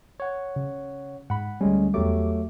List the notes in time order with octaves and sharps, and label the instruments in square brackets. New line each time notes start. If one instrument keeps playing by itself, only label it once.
[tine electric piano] C#5 F#5
[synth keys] C#3
[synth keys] G#2 B5 [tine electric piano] F#5
[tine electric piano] D2 G#3 C#4 [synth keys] G3
[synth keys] E2 G4 D6 [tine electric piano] F#3 A3